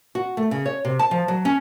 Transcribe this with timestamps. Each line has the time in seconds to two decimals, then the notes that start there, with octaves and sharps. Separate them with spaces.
0.15 F#4
0.37 A3
0.51 C#3
0.65 C#5
0.85 C3
0.99 A5
1.11 F3
1.28 F#3
1.45 C#4